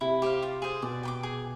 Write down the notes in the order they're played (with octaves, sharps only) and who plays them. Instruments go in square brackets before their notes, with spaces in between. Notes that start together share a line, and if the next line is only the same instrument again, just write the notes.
[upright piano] C3 [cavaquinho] E4
[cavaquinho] G4 C5 F5
F4
G#4 C5
[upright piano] B2 [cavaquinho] D5
[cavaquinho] G5 B5 D6
G#4